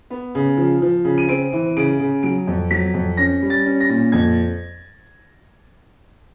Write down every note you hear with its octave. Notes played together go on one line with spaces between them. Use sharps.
B3
C#3
F3
F3
C#3
D#7
C4 D7
E3
C#3 D7
C#3
F#3 D7
F2
F#3 B6
F2
C#4 A#6
G3
A6
C#4
A#6
A#2
F2 G#6